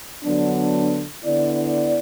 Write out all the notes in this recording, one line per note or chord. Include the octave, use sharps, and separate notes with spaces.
D3 F#3 B3 D4
D3 B3 E4 D5